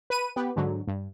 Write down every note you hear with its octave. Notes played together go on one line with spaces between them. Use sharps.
B4 D#7
B3 G4 B4
G#2 D3 F#3
G2